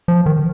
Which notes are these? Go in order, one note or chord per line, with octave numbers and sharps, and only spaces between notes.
F3
D#3